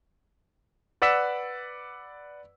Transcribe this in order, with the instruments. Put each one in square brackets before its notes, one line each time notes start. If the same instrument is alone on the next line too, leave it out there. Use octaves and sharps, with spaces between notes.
[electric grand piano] B4 D5 F#5 E6 B6 E7